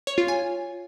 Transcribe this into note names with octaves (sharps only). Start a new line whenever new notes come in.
C#5
F4
G#5